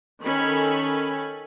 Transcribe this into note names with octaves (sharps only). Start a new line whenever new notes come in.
D#3 C#4 A4 G#5 B5